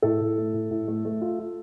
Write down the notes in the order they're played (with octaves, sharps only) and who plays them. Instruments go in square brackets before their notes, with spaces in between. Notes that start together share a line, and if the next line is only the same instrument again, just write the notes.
[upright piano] A2 A4
A2
A3
A2
A2
A3
A3
F4
F4